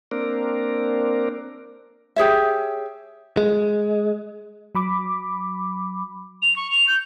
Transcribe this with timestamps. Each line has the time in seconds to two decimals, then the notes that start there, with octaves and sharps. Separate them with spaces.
0.11 A#3 C4 D4 A#4
2.16 G4 G#4 C#5 E5
3.37 G#3
4.75 F#3 B5 D6
6.42 F7
6.56 C#6
6.71 F7
6.87 G6